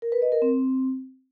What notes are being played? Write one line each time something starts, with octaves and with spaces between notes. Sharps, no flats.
A#4
B4
D#5
A#4
C4